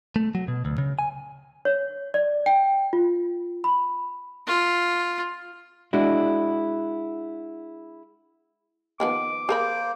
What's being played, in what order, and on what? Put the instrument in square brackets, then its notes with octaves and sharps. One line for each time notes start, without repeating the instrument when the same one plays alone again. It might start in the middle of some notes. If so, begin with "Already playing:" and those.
[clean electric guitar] A3
F#3
B2
D2
C#3
G#5
[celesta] C#5
D5
G5
F4
B5
[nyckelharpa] F4
[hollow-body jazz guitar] G#3 D4 E4 F#4
[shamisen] D#3 F3 B3 [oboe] D6
[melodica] A#3 C5 [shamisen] G#4 A#4 B5